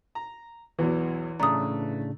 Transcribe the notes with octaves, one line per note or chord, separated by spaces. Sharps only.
A#5
B1 E2 B2 E3
A2 C#3 A3 D4 A#5 D#6